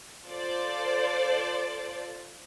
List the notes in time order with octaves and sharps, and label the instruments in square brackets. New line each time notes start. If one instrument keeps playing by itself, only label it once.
[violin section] F4 A4 C5 D5